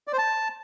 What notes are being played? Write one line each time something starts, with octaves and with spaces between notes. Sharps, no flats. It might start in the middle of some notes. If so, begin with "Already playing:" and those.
D5
C5
A5